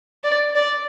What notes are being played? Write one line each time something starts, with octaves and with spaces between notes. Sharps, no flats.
D5
D5